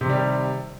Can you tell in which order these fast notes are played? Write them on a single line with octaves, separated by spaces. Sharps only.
C3 D#3 G3